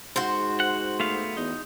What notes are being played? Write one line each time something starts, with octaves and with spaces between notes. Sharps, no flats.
G#2 F#4 C5
F#5
A3 B3 F5
E2 D#4